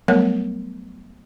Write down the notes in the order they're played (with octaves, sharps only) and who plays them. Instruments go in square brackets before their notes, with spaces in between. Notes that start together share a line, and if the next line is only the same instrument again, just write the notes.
[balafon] F#3 G3 A3 B3 A#4 C#5